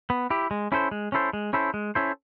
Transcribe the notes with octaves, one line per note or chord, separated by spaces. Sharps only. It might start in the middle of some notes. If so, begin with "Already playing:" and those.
B3
E4 G4
G#3
C#4 E4 A4 C5
G#3
C#4 E4 A4 C5
G#3
C#4 E4 A4 C5
G#3
C#4 E4 A4 C5